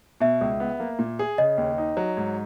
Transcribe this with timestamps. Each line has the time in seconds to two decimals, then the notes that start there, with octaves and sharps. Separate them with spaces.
0.20 B2 E5
0.41 C#2
0.60 B3
0.80 A#3
0.99 A#2
1.19 G#4
1.38 C#3 D#5
1.58 D#2
1.78 D#4
1.97 F#3
2.17 G#2